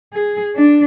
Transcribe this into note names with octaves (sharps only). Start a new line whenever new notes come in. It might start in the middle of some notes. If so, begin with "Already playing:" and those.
G#4
D4